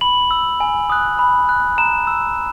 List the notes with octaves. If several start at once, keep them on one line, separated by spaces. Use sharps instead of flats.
B5 F#7
E6
G#5
D#6 F#6
B5
F#6
A#5 E7
E6